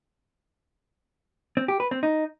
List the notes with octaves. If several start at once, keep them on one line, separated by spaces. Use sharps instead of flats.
C4
G4
B4
C4
D#4